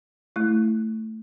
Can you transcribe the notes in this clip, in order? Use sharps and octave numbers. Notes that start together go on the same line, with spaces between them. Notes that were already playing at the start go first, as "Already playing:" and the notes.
A3 E4